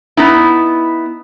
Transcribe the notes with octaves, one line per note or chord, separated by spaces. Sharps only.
B3 D#4 E4